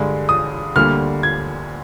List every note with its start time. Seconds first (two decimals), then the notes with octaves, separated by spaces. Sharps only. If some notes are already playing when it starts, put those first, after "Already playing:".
Already playing: G2 D3 G#3
0.29 D#6
0.76 D2 D3 G3 A#3 F6
1.23 G#6